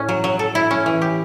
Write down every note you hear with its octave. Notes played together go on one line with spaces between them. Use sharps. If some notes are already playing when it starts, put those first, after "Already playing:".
Already playing: A2 C#4
F#3
F#3
A4
E4
C#4
E3
G4